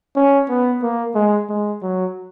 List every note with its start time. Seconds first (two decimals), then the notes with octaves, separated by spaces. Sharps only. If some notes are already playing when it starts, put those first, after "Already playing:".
0.16 C#4
0.49 B3
0.82 A#3
1.15 G#3
1.49 G#3
1.82 F#3